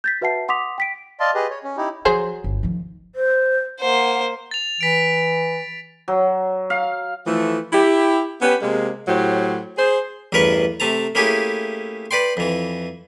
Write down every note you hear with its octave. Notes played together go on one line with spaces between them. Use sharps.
G6 A6 B6
F#4 B4 E5 F#5 A5 C7
F#5 C6 D6 D#6 B6 F7
G5 B6 D7
D5 D#5 F5 A5 C6
G4 G#4 B4 D#5
C#5
C#4
D#4 E4 G4
F3 F#3 G#4 C5
G1
D#3 F3
C5
A#3 C5 F#5
A6 F7
E3 B6 D7
F#3
F5
E3 F3 A3
E4 G4
B3 C#4 G4 B4
C3 G#3 A#3
A2 F#3 G4 C5
G#4 C5
A1 E2 G2 A#4 B4 C#6
C3 A3 A5 A#5
A3 A#3 C#4 E4 G4 G#4
B4 D5 G5 C6
F2 E3